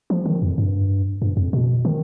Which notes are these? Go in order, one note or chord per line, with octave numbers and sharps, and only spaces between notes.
F3
D#3
F2
G2
G2
F2
B2
D#3